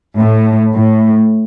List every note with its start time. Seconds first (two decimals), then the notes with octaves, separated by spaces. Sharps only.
0.17 A2
0.74 A2